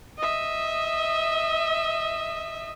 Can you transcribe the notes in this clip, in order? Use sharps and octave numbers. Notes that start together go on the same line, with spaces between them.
D#5 E5